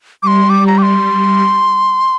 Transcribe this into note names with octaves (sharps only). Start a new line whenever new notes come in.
G3 D6
C6
D6
A#5
D6
C6